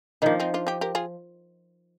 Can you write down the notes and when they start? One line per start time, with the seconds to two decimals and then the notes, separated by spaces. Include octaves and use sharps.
0.22 D#3 F3 A#3 D4 D#4
0.40 C4 D#4
0.54 D4 F4
0.67 D#4 G4
0.81 G4 A#4
0.95 F4 G#4